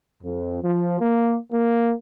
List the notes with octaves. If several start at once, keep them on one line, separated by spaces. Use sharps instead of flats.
F2
F3
A#3
A#3